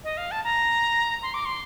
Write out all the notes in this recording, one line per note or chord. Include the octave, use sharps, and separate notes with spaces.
D#5
F5
A5
A#5
C6
D6
C6